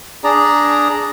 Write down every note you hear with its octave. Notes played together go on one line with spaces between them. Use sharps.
D4 G#4 D5 A#5